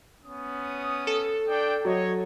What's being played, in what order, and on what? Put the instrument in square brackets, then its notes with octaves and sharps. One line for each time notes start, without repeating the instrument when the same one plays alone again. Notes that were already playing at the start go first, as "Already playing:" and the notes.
[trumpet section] B3 C#4 D#6
[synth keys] A4
[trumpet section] D4 G5
[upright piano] F#3 [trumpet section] C#5 D#5